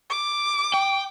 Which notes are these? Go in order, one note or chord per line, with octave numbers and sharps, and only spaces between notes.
D6
G5